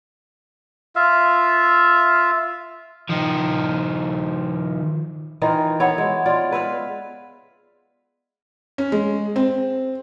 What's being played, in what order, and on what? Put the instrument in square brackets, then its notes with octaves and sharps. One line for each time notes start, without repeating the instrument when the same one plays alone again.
[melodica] F4 E5 F5
[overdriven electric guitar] D#3 F3
[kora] D#3 E3 D#4 F4
B3 E4 C#5
G#3
F4 D5
G#4 B4 E5 F5
[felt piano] C#4
G#3
C4